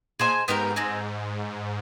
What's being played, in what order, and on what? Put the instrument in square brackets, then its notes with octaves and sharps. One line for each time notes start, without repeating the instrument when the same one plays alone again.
[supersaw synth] A#2 [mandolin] G#4 C5 D#5 G#5
[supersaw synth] G#2 [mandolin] B3 D#4 G4 A#4
[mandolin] C4 D#4 G#4